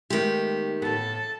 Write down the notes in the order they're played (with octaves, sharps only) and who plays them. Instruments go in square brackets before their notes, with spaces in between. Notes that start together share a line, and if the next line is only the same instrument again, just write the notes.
[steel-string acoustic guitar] D#3 G4 [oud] G#3 A3 B3
[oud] A2 B3 [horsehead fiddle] A4 A5